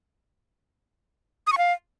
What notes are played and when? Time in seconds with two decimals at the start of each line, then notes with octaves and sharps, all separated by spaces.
1.47 D#6
1.52 C#6
1.58 F5